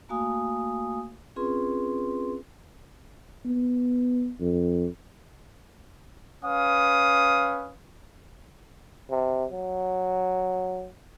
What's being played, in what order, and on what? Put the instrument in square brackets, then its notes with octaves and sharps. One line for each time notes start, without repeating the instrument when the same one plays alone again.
[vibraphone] A3 A#3 F#4 F5 G#5 D#6
C4 C#4 F4 G#4 B4 C6
[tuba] B3
F2
[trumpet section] C#4 B4 F5 D#6
[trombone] C3
F#3